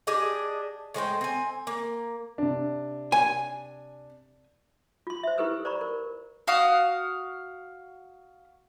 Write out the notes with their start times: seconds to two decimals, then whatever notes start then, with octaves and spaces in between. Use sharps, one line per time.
0.07 D4 G4 G#4 D#5
0.94 A2 G#3 C5 G5
1.21 C4 G#5
1.67 A#3
2.38 C3 D4
3.12 G#5
5.07 F4 C6
5.23 C5 E5
5.38 E4 F4 G4 A4 B4 E6
5.65 C5 D5 A#5 B5 C#6
5.81 A#4
6.47 F#4 F5 D#6